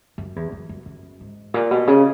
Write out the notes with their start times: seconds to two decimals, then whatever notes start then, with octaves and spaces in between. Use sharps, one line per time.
0.18 F#2
0.36 E2
0.52 F#2
0.69 F#2
0.86 F#2
1.21 G#2
1.54 A#2
1.71 B2
1.87 C#3